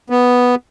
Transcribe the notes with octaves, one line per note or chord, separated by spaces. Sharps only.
B3